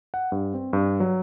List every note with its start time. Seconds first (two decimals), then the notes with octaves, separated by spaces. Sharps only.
0.14 F#5
0.32 G2
0.54 C4
0.73 G2
1.00 F#3